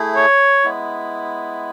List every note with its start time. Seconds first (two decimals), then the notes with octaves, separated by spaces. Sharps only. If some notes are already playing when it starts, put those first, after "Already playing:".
Already playing: A3 E4 G#4
0.16 C#5
0.64 G#3 B3 E4